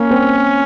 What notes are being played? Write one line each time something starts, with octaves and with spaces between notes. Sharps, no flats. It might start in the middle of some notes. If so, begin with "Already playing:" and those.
Already playing: A#3 C#4
C4